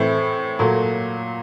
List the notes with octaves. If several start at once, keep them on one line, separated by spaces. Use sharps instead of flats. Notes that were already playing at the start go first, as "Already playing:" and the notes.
Already playing: A2 E3 A3 C4 E4
A#2 F#3 A3